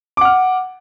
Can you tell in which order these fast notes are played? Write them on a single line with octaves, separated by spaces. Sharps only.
D6 F#5 F6